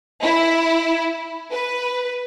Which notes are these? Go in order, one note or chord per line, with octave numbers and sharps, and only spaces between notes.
E4
B4